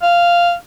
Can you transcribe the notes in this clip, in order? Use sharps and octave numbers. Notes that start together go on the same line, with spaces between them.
F5